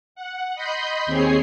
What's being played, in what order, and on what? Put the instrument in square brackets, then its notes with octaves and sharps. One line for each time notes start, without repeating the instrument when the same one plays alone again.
[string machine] F#5
D#5 B5 C6 G6
D#2 C4 G#4 C#5 C7